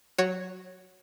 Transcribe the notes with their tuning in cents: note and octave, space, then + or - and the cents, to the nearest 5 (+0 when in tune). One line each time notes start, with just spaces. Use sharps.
F#3 -5 F#4 +0 C#5 +0